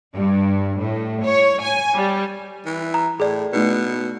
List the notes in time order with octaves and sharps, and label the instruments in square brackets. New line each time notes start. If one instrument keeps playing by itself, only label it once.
[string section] G2
A2
C#5
G#5
G3
[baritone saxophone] E3
[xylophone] A#5
[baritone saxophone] A2 [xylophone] G#4 D5
[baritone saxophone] B2 [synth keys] A3 D#4 B4